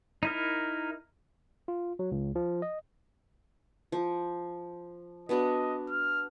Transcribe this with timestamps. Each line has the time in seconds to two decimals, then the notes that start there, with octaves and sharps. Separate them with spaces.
0.23 D#4 E4 A#4
1.68 F4
1.99 F#3
2.12 C#2
2.35 F3
2.62 D#5
3.92 F3
5.29 B3 D4 F#4 D#5
5.90 F6